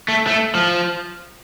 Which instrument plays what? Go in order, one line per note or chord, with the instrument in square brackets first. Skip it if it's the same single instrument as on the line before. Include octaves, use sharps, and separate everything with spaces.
[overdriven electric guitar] A3
A3
F3